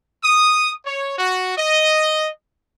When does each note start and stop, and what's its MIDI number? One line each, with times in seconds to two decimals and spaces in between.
0.23 0.71 87
0.86 1.17 73
1.19 1.55 66
1.57 2.30 75